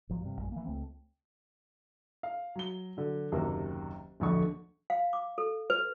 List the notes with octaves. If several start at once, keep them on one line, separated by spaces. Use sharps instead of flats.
G#1 F3 F#3
G2 C3
A#1 F#2 G#3
E3 A#3
C#2 A3 C4
F5
F#3 G7
D3 F#3
F#1 D#2 C3 F#3 A#3
D1 A#1 F2 D3 C#6
F5
D6
A4
B4